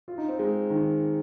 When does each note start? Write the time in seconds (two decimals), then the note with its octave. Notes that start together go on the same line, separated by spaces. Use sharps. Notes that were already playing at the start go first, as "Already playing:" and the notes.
0.08 F4
0.18 D#4
0.28 C4
0.39 G#3
0.70 D#3